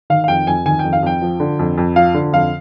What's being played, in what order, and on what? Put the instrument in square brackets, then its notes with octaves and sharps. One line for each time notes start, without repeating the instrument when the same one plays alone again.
[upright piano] D#3 F5
F5
F2 G5
F2 G#5
D#3 G#5
F2 G5
F5
F2 G5
F3
D3
F2
F2
F3 F5
D3
F2 F5